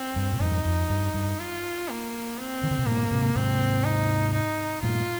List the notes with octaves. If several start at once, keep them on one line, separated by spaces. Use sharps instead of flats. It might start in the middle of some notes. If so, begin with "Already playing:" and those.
Already playing: C4
G2
A#2
F2 G#2 D#4
F2
G2
G2
F4
A#3
C4
D#3
D3
C3
G2 A#2 A#3
G#2 C3
G#2 C3 C4
D#4
D#4
G2 A#2 F4